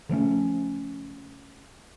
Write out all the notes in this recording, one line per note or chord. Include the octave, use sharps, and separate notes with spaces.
C#3 F3 A3 C#4